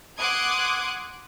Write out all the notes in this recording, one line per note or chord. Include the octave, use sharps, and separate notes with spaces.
F#5 C6 D6 D#6 F#6 G#6